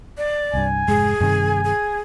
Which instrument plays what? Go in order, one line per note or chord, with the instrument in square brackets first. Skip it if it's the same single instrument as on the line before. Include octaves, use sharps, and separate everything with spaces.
[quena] D5
[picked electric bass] C2 G2 [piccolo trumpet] G#5
[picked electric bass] F1 G#2 G#3 [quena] G#4
[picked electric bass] G2 C3 D#3 [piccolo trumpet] G#5
[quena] G#4